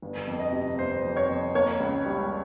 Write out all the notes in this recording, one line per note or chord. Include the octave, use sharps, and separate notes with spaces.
G1
F2
D#5
C3
G1 C5
F2
C#5
F2
A#3 C#5
C#2
G3